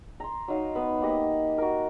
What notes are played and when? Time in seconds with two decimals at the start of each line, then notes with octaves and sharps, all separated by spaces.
0.20 A#5 C6
0.48 F#3 D#4 F5
0.75 B3 B4
1.01 A#3 G4 D#5 F#5
1.58 F#4 A#4